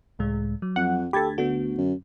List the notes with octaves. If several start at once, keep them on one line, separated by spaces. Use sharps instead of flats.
C#2 A2 G#3
F#3
F2 F#5
D2 G4 A4 B5 G#6 A6
D3 B3 F#4
F#2